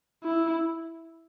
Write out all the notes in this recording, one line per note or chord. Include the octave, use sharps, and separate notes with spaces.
E4